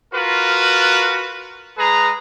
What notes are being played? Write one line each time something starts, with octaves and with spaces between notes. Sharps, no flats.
F4 F#4 A#4 B4
G#3 G#4 B4 A#5